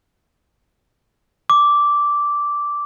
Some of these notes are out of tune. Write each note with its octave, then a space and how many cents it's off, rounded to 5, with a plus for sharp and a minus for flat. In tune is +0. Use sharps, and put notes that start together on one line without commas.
D6 -10